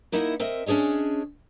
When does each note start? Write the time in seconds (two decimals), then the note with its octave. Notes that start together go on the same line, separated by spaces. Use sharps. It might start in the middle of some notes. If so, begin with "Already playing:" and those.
0.12 A#3 D#4 E4 D#5 E5 F#5
0.40 C4 A#4 D#5 E5
0.66 C#4 D4 G#4 C#5 D#5